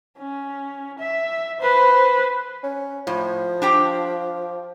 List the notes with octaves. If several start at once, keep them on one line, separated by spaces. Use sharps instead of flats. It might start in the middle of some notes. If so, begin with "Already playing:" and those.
C#4
E5
B4 C5
C#4
A2 F3
D4 G4 G5